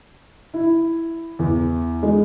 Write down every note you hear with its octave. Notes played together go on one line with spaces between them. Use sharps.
E4
E2
G#3